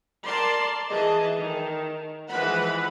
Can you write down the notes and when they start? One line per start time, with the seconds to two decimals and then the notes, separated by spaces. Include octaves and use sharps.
0.25 A#4 D5 A5 C6
0.89 E3 G#4 D#5 A5
1.38 D#3
2.30 E3 F3 G#3 B4 F#5 B5